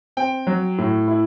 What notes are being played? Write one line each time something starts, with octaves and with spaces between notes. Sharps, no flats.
C4 G5
F#3
A2
E4